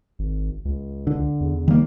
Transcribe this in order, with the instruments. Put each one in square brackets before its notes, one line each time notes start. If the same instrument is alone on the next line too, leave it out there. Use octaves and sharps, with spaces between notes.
[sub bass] G#1
C#2
[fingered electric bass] D3
[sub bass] E2
[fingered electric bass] D#3 G3 A#3